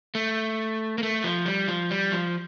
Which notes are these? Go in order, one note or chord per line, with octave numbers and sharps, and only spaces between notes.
A3
A#3
A3
F3
G3
F3
G3
F3